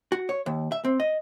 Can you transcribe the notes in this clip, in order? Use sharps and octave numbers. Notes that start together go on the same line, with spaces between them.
F#4
C#5
D#2
E5
C4
D#5